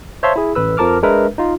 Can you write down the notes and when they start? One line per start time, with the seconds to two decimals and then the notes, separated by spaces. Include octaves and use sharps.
0.23 C5 C#5 E5 F5 A5 C6
0.36 E4 G#4
0.55 A1 B4 E6
0.77 F2 F3 A#4 A5 D6 F6
1.03 G#3 D4 A#4 B4 E5
1.38 D#4 F4